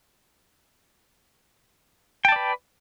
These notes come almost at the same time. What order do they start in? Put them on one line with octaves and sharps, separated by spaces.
G5 A5 D5 B4